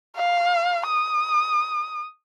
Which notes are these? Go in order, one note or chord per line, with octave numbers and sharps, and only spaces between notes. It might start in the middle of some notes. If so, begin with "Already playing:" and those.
F5
D#6